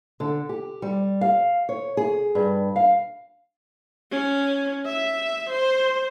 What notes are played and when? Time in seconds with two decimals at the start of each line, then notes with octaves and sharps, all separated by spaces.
0.20 D3
0.49 G4
0.82 G3
1.21 F5
1.69 C#5
1.97 G#4
2.35 G2
2.76 F5
4.12 C#4
4.86 E5
5.50 C5